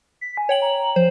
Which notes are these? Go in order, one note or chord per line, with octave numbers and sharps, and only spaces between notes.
B6
G#5
C#5 G5 F#7
A#5
F3 C5